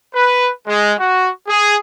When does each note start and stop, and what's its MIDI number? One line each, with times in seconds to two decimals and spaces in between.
0.14 0.51 71
0.66 0.93 56
0.99 1.29 66
1.48 1.77 68